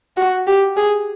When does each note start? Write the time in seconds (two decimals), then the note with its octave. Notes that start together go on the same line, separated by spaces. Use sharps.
0.17 F#4
0.47 G4
0.77 G#4